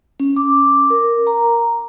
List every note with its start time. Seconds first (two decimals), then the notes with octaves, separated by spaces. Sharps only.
0.20 C#4
0.36 D6
0.90 A#4
1.27 A#5